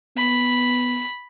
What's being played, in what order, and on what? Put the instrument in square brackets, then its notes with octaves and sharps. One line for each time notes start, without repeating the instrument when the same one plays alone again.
[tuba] B3 [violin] B5